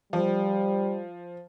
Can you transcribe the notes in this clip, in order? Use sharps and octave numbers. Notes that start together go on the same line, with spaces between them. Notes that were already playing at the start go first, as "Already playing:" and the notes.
F3 G3